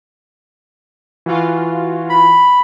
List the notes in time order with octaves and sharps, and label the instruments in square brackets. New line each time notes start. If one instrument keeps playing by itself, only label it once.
[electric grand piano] E3 [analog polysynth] F4 F#4
[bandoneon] B5